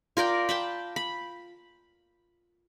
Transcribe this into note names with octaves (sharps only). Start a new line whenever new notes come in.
F4 A#4 D5 G5
G5 A5 B5
B5